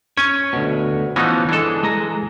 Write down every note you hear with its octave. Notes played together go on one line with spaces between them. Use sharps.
C#4 C#5 G#5
D2 B2
E3 F3 B3 C#4 D#4 F#4
E3 G#3 D4 A4
G#3 G#4 A#5